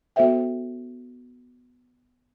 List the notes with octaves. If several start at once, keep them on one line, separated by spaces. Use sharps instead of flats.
B3 F#4 A4 C5 E5 G5